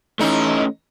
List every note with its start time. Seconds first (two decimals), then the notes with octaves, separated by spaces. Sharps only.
0.19 E3 A3 C#4 D#4